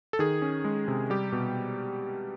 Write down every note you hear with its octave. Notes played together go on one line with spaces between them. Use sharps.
A4
D#3 G#4
C#4
G#3
C3
G3 G4
B2